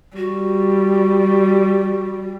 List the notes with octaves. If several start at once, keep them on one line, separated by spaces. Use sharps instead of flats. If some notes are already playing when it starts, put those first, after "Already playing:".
G3 F#4